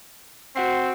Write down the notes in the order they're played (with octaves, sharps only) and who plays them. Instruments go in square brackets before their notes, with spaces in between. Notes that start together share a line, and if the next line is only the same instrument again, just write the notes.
[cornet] C4 [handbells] F#4 F#5 C7